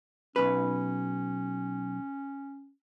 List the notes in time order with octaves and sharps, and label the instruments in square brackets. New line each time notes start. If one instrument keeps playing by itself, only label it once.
[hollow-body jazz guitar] B1 B4 [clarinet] C#4